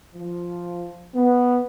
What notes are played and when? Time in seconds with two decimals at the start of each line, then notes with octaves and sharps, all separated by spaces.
0.15 F3
1.15 B3